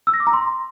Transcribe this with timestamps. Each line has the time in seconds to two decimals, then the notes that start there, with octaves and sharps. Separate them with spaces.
0.07 E6
0.14 A#6
0.20 D6
0.27 A#5
0.33 C6